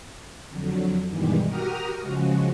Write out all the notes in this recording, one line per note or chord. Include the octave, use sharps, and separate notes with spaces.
F2 D3 F#3
G2 B2 D#3 E3 G3 G#3
F#4 G4 A#4 A#5 D#6 F6
C#3 F3 G#3 F#4